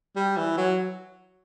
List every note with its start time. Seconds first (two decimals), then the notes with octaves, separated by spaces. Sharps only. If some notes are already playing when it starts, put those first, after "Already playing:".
0.16 G3
0.37 E3
0.57 F#3